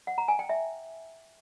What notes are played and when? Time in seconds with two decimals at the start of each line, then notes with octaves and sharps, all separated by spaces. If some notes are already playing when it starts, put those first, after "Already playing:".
0.07 F#5
0.18 A#5
0.28 G#5
0.39 G5
0.49 E5